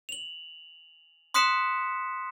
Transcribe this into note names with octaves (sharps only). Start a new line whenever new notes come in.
F7 F#7
C6 D#6 F#6 B6 C#7 E7